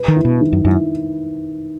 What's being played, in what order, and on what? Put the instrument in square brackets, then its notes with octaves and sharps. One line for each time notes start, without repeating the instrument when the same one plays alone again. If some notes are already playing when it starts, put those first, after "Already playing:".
Already playing: [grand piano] B4
[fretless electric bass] D#3
[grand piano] E4
[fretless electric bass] B2
[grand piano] D#3
[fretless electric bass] F#2
[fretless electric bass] F#2 [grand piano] E4